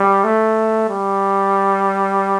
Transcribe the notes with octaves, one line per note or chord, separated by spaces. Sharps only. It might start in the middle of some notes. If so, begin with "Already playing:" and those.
Already playing: G3
A3
G3